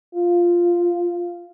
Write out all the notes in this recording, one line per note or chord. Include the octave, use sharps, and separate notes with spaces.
F4